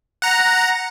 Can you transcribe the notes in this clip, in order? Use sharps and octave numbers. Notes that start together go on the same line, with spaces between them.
F#5 A#5